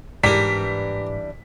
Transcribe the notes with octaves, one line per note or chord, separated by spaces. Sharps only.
G#2 E3 G3 D4 G4 A#4 B6